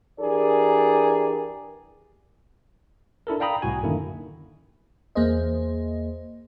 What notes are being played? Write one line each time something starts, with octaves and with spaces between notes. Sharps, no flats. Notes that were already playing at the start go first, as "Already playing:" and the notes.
E3 D4 G4 G#4 A#4 D5
D4 E4 A4 A#4
D5 F5 G5 A#5 B5 D#6
C2 A2 F#4 G#5
F#2 D3 D#3 A#3 E4
E2 A#3 G#4 C5 D#5